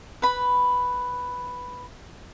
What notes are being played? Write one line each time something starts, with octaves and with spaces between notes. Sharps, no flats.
B4 B5